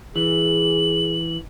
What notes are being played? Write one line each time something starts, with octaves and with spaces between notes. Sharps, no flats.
E3 G#4 F#7